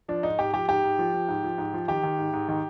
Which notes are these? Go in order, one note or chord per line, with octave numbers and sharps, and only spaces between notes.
F3 D4
G#2 D#4
G#2 G4
F3 G4
G#2 G4
G#2
F3
F3
G#2
F3
G#2
F3
D#3 G4
D#3
G#2
G#2
D#3